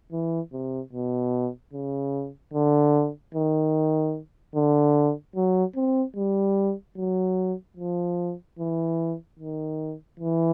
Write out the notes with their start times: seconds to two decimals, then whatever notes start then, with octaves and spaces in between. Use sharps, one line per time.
0.12 E3
0.53 C3
0.93 B2
1.73 C#3
2.54 D3
3.34 D#3
4.56 D3
5.36 F#3
5.76 C4
6.17 G3
6.97 F#3
7.77 F3
8.59 E3
9.39 D#3
10.20 E3